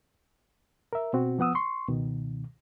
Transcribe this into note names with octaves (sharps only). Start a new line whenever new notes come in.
A#4 E5
B2 C4 F#4
F3 B3 F#5 D#6 E6
C6 C#6
C#2 B2 D#3